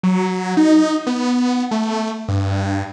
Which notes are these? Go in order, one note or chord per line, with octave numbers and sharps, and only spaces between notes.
F#3
D#4
B3
A3
G2